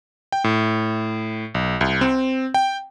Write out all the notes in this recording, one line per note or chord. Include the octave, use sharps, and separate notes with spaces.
G5
A2
B1
C2
C4
G5